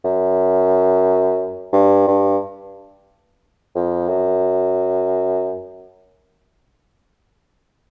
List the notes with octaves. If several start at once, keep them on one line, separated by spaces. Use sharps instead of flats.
F#2
G2
G2
F2
F#2